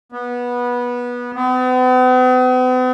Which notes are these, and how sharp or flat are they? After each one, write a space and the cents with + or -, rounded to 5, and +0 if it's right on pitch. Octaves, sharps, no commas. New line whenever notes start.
B3 -20
B3 +45